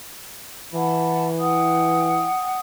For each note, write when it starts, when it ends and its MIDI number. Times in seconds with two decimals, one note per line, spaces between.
0.73 2.31 52
0.73 1.27 78
0.73 1.27 81
0.73 1.27 83
1.38 2.59 78
1.38 2.59 79
1.38 2.59 87